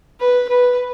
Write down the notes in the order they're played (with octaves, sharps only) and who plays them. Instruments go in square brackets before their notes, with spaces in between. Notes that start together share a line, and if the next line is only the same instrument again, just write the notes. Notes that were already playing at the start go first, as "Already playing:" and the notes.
[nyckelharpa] B4
B4